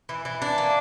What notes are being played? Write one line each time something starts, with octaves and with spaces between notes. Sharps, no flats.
E3
E3
D4
A#3